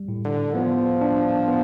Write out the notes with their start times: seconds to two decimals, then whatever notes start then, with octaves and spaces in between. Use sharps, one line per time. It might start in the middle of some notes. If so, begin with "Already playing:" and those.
Already playing: G3
0.09 A2
0.25 D3
0.55 F3 B3
1.01 D4
1.48 B3